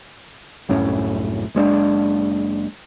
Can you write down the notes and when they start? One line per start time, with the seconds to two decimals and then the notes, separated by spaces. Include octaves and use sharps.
0.69 C2 F#2 A2 C#4
1.55 F#1 G#3 C#4 D4